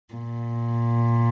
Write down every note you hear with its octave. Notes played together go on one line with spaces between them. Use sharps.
A#2